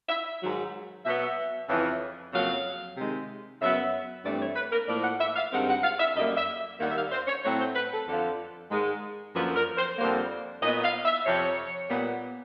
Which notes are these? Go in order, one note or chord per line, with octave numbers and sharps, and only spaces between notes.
E5
G#2 D#3 F#3
B2 F#3 B3 E5
F2 C#3 E3
F2 C#3 F#3 A#3 F5
C3 D#3 G#3
F#2 C#3 F#3 B3 E5
G2 E3 A3 C4 D5
C#5
B4
A#4
A2 F3 A#3 D5
F#5
E5
F5
G2 D#3 G#3 C4 F#5
F#5
F5
E5
F#2 D3 G3 A#3 D#5
E5
D#2 D#3 G3 A#3 F#5
E5
F5
C5
C#5
A2 F#3 A3 C4 C#5
C5
B4
A4
F2 D3 F3
G#2 D#3 G#3
F#2 D3 F3 A#3 B4
A#4
C5
F2 D3 G3 A#3 C5
A#2 F#3 B3 D#5
F5
E5
F2 C3 F3 C#5
A#2 G3 B3